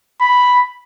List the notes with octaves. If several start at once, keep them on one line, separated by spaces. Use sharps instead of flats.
B5